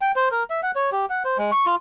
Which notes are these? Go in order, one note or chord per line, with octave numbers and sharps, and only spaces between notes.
G5
C5
A#4
E5
F#5
C#5
G4
F#5
C5
G#3
C#6
F4